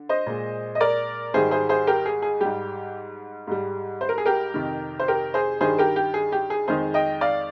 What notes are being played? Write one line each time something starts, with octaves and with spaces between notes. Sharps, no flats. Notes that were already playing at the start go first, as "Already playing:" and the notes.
Already playing: D3
C5 D#5
A#2 G#3
D#5
A#4 D5
G#2 D#3 G3 G#4 C5
G#4 C5
G#4 C5
G4 A#4
G#4
G#4
G#2 G3 G4
G#2 G3
C5
A#4
G#4
G4 A#4
F2 C3 D#3
C5
G4 A#4
G#4 C5
G2 D#3 G3 G#4 C5
G4 A#4
G4
G#4
G4
G#4
F2 D#3 G#3 G#4 C5
D#5 G5
D5 F5